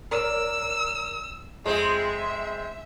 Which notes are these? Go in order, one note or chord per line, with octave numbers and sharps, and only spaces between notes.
A#4 C#5 D5 E6
F2 G#3 C4 G#4 E5